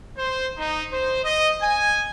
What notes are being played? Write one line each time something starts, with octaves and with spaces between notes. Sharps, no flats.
C5
D#4
C5
D#5
G#5